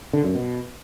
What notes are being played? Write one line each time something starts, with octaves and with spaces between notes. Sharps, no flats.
D3
F#2
B2